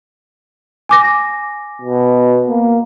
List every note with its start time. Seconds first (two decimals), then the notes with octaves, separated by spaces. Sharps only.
0.89 G#5 D6 A#6
1.82 B2
2.48 A#3